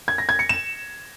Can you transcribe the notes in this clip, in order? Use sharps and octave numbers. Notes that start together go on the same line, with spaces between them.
G#6
A#6
G#6
C#7
E7